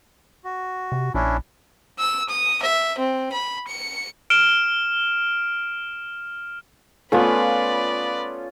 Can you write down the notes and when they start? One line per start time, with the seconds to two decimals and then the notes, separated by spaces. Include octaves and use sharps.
0.44 F#4
0.92 C3
1.14 A#1 C#4 D4 E4
1.99 E6
2.29 D#6
2.63 E5
2.98 C4
3.32 B5
3.68 C#7
4.30 F6 D7 E7 G7
7.12 A3 B3 C#4 F4 B4 D5